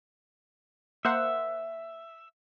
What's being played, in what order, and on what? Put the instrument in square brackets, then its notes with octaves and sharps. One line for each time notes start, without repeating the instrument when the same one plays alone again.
[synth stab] A#3 C5 F#5 [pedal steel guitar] E5